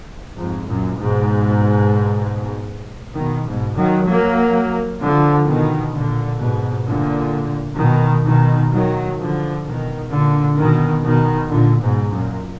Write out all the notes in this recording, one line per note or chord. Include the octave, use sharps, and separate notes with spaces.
F2 G#2
F#2 A#2
G#2 B2
B2 D#3
G#2 B2
D#3 F#3
F#3 A#3
D3 F3
B2 D#3
A#2 D3
G#2 B2
A#2 D3
B2 D#3
B2 D#3
D#3 F#3
D3 F3
B2 D#3
A#2 D3
B2 D#3
B2 D#3
A#2 D3
G#2 B2
F#2 A#2